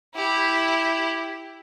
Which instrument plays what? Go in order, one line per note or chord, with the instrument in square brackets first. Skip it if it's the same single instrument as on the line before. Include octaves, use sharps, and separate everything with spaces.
[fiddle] E4 G4